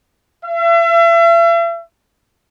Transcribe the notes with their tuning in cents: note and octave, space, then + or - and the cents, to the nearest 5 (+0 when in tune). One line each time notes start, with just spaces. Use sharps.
E5 +40